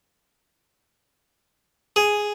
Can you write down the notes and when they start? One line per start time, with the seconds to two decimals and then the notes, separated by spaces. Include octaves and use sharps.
1.96 G#4